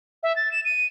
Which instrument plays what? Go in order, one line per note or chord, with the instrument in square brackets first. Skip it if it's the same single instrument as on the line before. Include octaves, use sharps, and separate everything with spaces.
[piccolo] E5
A6
E7
D#7